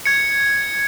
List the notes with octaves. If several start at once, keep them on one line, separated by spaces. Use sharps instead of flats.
G#6 C#7